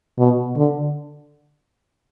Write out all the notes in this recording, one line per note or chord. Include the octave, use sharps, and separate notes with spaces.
B2
D3